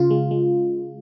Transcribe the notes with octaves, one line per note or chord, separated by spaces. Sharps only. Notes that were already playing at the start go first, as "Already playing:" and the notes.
Already playing: C#3 F4
G#3
G#3